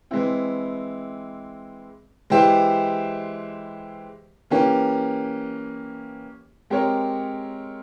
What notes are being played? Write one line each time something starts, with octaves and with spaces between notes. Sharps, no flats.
E3 G#3 C4 E4
E3 G#3 E4 G4 C5
E3 A#3 C#4 G4
G#3 C4 G4 A#4 C#5